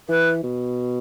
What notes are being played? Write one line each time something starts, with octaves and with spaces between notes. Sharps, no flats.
E3 B4
B2